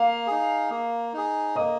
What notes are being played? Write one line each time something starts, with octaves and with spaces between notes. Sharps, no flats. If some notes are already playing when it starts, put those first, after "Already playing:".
Already playing: A#3 F5
D#4 G#4
A#3
D#4 G#4
A#3 D#5 D#6